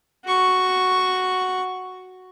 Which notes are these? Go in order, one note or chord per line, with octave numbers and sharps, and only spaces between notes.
F#4 C#6